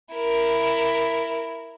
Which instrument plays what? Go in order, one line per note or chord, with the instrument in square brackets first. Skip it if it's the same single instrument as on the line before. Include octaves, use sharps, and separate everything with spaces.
[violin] E4 A#4